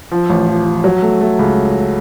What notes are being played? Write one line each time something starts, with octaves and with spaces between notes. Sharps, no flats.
F3
A1
F3
F3
F#3
A3
A3
C#2